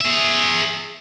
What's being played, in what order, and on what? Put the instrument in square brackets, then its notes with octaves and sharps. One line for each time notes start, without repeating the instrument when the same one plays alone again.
[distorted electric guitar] G#4 E5